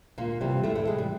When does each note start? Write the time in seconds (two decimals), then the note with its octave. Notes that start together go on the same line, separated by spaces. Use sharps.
0.18 D2 A#2 A#3
0.41 C3 E3 G3
0.64 D2 A2 A3
0.75 A2 A3
0.87 C3 E3 G3 G#3
0.98 G3